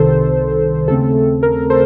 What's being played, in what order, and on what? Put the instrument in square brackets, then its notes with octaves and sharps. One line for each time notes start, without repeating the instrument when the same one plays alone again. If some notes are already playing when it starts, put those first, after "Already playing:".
Already playing: [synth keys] C2 C3 D#3 A4 C5
D#2 C#3 A3 C4 A4
A#4
A4 C5